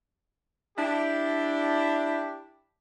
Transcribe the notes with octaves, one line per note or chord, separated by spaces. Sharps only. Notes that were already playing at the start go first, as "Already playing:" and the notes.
D4 E4 G4